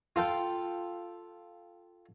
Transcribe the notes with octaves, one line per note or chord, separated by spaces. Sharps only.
F4 A4 G5